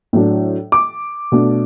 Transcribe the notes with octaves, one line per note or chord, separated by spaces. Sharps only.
A2 F#3 D4
D6
B2 A3 D4